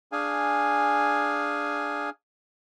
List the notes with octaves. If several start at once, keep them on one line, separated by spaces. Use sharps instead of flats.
D4 G#4 F5 G#5